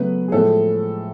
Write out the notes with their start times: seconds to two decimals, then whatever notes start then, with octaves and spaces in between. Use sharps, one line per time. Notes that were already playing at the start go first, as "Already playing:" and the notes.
Already playing: C#3 F#3 A3 B3 B4
0.28 G#4
0.32 A2 F3 G#3 A3 A4